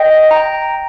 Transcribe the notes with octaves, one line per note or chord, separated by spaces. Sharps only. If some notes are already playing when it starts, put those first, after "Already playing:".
Already playing: D#5 G5
G5 A#5